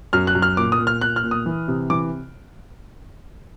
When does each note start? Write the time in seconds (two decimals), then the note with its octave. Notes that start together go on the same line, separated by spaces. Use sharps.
0.13 F#2 F6
0.27 F#6
0.35 F#2
0.42 F6
0.57 A#2 D6
0.72 D#6
0.79 A#2
0.87 F6
1.01 A#2 F#6
1.16 F6
1.23 A#2
1.31 D#6
1.46 E3
1.68 C3
1.90 E3 D6